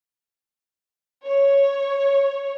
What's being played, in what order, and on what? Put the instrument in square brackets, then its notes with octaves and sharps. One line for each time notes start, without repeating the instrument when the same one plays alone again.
[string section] C#5